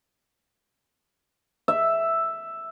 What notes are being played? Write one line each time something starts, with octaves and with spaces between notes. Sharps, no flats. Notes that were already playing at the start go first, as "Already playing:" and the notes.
E5